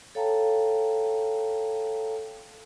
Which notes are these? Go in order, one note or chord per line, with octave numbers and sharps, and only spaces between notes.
A4 C#5 F5 G5 A5 A#5